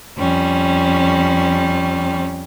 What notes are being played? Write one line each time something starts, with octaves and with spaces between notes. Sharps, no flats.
F2 G3 C#4